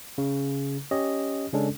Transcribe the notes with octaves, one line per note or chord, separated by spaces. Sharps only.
C#3
C#4 G4 C#5 D#5
C#3 G#3 C#4 D4 A4